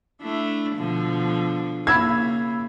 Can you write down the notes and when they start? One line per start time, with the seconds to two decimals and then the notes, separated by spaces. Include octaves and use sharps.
0.23 A3 D4 E4
0.76 B2 D3 F3
1.87 C#3 A#3 E4 B5 E6 G#6